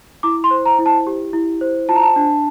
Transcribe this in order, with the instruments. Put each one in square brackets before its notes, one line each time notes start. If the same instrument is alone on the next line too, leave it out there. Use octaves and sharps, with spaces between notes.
[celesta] E4 D6
C6
C5
A#5
E4
A5
G4
E4
C5
F4 A5
A#5
A5
D4